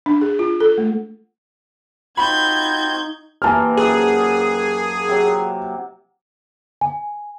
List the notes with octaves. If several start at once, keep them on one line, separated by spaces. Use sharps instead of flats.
D4
G#4
F4
A4
A3
C4 D#4 F4 F#4 B5 G6 G#6
C3 E3 A#3 G#5 A5 F6
F#2 G#4 F#5
C3 F#3
G#5